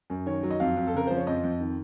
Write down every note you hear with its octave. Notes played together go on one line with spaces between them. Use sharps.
F#2
D#3 C#5
F#3
D#5
F2 F5
F2
A4
C#3 A#4
F3 C5
C#5
F2 D#5
F2
D#3